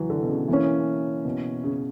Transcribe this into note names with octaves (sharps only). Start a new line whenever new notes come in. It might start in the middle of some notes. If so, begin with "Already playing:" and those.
Already playing: E3 F#3
D3
B2
C#3
E3 A#3 C#4
B2
C#3